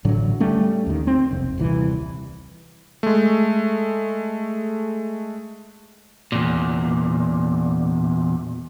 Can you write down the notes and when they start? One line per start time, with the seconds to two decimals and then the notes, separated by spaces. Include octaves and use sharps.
0.05 A1 A2 D3 F#3
0.40 G3 A3 C#4
0.86 D#2 D#3
1.07 C4
1.31 F1 B1
1.58 D#1 C2 E3
3.03 G#3 A3
6.32 E2 A#2